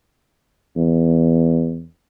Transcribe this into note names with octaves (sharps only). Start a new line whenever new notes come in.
E2